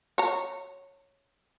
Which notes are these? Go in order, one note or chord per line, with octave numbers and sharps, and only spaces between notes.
C#5 A#5